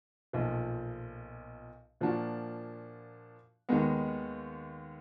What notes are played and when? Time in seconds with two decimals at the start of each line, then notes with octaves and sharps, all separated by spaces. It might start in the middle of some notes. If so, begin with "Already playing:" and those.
0.33 B1 A#2 F3
2.01 A#2 F3 A#3 D4 F#4
3.69 D#2 D#3 G#3 B3